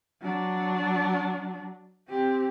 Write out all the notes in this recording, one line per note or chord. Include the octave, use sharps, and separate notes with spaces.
F#3 D4
C4 G4